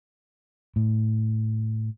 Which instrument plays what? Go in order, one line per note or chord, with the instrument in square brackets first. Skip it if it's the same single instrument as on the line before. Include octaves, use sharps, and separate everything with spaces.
[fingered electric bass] A2